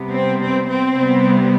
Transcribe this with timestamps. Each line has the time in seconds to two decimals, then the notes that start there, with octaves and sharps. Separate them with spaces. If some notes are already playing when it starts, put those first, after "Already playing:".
Already playing: C3 G3 B3
0.11 C4
0.39 C4
0.67 C4
0.95 C3 G3 B3